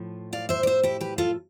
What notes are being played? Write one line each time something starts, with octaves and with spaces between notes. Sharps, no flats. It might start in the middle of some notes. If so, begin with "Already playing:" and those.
Already playing: A2 F3
D5 F5
C5 E5
D5
C5 E5
E4 G4
G4 B4
F4 A4